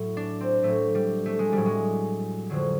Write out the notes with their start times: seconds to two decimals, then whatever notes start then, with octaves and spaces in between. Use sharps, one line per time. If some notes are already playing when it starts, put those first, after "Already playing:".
Already playing: A2 F#3
0.17 D4
0.41 C4
0.63 A2 F#3 A3
0.95 G3
1.26 A3
1.39 G#3
1.53 A2 F#3 G3
1.66 G#3
2.50 F2 D3 F#3